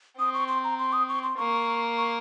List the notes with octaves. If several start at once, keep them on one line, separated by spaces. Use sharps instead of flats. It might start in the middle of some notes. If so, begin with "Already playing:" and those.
C4 D#6
C#6
C6
A#5
C6
D#6
C#6
C6
A#3 C#6
C#6